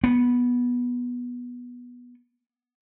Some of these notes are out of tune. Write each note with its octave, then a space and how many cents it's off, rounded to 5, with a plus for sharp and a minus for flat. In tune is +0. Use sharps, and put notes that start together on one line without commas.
B3 -10